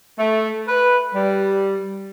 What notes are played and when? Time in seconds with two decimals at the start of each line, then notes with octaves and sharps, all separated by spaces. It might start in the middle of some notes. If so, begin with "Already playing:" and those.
0.19 A3
0.68 B4
1.14 G3